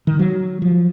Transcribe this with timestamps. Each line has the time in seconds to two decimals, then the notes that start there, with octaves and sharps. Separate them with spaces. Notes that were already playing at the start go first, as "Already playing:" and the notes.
0.07 D#3
0.19 F#3
0.62 F3